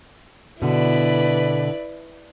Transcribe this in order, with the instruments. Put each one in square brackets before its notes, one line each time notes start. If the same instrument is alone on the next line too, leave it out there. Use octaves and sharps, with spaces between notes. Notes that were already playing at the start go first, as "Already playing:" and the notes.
[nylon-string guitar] B2 D3 [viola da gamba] E4 B4 D5